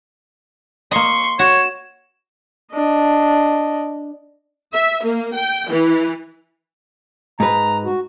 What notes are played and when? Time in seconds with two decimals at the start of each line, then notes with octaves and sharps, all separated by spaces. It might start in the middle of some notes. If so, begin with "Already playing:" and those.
0.91 A#3 D#5 C6 C#6
1.39 F#4 C#5 E7
2.73 D4 D#5
4.74 E5
5.04 A#3
5.36 G5
5.70 E3
7.40 G#2 B4 A#5
7.85 F#4